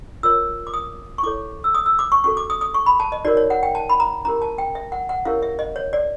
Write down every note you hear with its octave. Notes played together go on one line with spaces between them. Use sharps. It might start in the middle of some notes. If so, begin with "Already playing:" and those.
F4 A#4 C#5 E6
D6
D#6
C#6
E4 A4 C#5 D6
E6
D#6
E6
D6
C#6
C#4 F#4 A4 C#6
D6
D#6
D#6
C#6
B5
A5
D#5
D#4 F#4 A#4 C#5 D5
C#5
F#5
G5
A5
B5
A#5
C#4 E4 G4 A#4 A#5
A5
G5
E5
F#5
F#5
C#4 E4 G4 A#4 C#5 F5
E5
D#5
C#5
D5